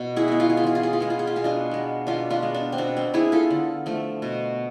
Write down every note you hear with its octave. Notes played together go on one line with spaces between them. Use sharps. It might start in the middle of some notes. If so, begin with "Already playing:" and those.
Already playing: B2
E4 G#4
G#3 B3
F4
G#4
F4
E3 G#4
F4
G#4
F4
G#3 B3 G#4
F4
G#4
F4
B2 G#4
D4 F4
G#3 B3
B2 D4 F4
D4 F4
G#3 B3
D4
C4
B2 D4
C4
B3 E4 G#4
F4 A4
D3
F3 A3
B2